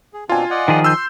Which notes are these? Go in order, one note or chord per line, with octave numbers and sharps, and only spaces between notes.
G#4
B2 C4 D4 F4 G#5
D5 D#5 F#5
D#3 F3 G#4
C6 E6 G6